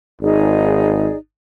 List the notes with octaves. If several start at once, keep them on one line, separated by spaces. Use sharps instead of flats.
G#1 D#4 G#4 D5